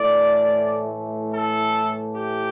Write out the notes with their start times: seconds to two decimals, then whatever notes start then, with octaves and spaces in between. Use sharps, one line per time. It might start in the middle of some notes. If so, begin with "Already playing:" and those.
Already playing: A2 E3 A3 D5
1.33 A4
2.14 G4